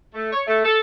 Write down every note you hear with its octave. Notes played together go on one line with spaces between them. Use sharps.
A3
C#5
A3
A4